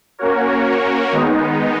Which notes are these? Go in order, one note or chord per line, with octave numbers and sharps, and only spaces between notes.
A#3 C#4 F#4 A#4 C#5
D#3 G#3 B3 D#4